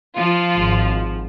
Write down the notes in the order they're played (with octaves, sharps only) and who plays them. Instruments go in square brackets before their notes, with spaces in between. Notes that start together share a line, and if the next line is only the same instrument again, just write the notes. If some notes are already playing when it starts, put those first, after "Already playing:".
[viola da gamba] F3 [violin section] F4
[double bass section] G#1